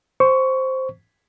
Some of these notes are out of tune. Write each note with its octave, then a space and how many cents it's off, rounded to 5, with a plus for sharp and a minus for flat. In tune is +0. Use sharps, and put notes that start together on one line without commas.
C5 +0 C#6 +15